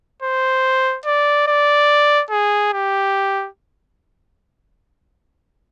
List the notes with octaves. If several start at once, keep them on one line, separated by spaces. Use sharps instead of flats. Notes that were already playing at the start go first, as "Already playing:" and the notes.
C5
D5
D5
G#4
G4